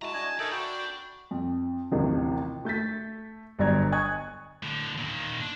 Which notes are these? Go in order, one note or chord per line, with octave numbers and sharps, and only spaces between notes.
G#3 E4 F#4 A5 A#5
D4 F#4 D#5 G#5
D#4 A4 A#4 C#5 D5 E5
D4 F#4 G5 B5
F2
A1 D#2 A2 C3 F3
A3 G6 A6 B6
G1 G2 F#3 D5 A#5 G#6
D#5 G#5 C#6 D#6 F#6 G#6
A2 D3
A#2 D#3
D4